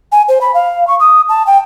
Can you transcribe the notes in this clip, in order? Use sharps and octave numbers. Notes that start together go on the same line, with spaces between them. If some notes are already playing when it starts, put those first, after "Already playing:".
G#5
C5
B5
F5
C#6
D#6
A5
G5